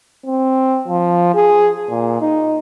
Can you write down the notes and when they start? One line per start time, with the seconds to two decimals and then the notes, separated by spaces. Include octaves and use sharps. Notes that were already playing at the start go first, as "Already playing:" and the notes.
0.26 C4
0.88 F3
1.35 G#4
1.90 A#2
2.21 D#4